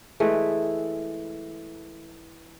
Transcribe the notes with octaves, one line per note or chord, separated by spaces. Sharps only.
E3 G#3 A3